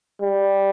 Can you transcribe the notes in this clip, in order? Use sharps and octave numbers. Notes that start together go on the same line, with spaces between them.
G3